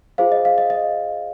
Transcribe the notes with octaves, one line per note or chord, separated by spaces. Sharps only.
F4 G#4 C5 F5
D#5
F5
D#5
D#5